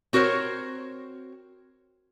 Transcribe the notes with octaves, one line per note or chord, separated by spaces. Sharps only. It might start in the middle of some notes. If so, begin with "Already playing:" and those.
C4 F#4 A#4 C5 C#5